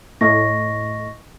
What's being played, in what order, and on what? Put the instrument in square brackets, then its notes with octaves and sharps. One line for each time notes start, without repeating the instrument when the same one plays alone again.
[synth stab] A2 [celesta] D#5 C#6 A#6